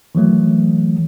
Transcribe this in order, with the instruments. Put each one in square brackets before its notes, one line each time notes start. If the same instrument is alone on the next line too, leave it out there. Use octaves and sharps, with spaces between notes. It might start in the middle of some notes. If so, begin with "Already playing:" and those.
[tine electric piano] D#3 E3 F#3 A3